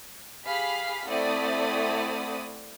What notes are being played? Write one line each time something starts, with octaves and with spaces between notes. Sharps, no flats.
G4 G#4 F5 B5 B6 C7
A3 C4 E4 D5 F#5 D#6